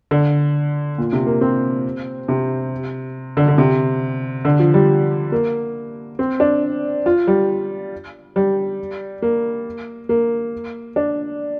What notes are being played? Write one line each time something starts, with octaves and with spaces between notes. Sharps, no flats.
D3
A#2
C3
A#3
C4
C3
D3
D3
C3
D3
F3
G3
A#3
C4
D4
F4
G3
G3
A#3
A#3
D4